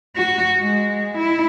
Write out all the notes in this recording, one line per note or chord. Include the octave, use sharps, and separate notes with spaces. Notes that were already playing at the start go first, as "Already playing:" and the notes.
F#4
G#3
E4